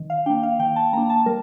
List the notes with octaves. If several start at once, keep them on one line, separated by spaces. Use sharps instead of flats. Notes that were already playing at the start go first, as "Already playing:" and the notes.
Already playing: D#3
F5
A#3 D4 G5
F5
D#3 G5
A5
A#3 D4 A#5
A5
G3 A#4